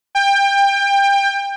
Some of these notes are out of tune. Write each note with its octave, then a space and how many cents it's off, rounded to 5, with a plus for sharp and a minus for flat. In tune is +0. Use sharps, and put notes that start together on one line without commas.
G5 +25